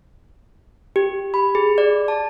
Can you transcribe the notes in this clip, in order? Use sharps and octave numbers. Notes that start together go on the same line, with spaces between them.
G4
B5
G#4
D5
A5